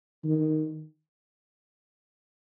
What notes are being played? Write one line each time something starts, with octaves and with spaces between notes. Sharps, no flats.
D#3